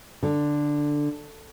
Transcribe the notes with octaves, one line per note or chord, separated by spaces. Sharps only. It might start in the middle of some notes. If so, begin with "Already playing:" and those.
D3